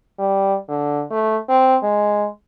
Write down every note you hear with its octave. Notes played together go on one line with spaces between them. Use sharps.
G3
D3
A3
C4
G#3